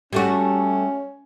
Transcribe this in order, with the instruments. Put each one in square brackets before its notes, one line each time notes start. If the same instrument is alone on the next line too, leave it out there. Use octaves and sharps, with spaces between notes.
[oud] G3 A3 F#4 [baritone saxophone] C#4